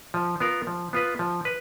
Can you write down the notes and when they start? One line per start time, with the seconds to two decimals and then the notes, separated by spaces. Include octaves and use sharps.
0.14 F3
0.40 B3 F4 A#4
0.67 F3
0.93 B3 F4 B4
1.19 F3
1.45 B4